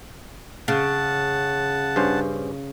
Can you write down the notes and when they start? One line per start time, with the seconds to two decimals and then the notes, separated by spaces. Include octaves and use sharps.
0.68 C#3 F#5 A5
1.96 G2 C#4 C5